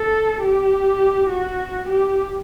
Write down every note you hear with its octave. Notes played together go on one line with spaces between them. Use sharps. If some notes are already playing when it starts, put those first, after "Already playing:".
Already playing: A4
G4
F#4
G4